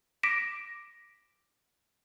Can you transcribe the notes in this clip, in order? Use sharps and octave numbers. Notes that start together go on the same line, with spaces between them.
D6 A#6 B6 D7 E7